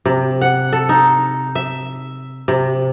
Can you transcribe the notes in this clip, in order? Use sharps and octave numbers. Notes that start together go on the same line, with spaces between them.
C3
F#5
A4
D#4
E5
C3